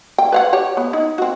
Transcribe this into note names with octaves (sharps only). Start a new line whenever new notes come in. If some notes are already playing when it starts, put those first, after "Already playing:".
G5
B4 F5 F#5
G4 C#5
B3
D#4
C4 F#4